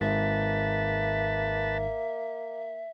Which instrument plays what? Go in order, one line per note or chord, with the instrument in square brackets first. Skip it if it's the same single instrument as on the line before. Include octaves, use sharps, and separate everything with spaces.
[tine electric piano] G#1 G#2 [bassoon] A#3 [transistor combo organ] B4 A5 [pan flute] E5